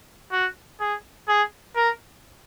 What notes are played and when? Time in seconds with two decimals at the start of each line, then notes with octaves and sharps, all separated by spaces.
0.32 F#4
0.80 G#4
1.28 G#4
1.76 A#4